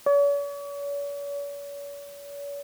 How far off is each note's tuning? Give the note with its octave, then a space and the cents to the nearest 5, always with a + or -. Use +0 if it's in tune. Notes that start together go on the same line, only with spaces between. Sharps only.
C#5 +45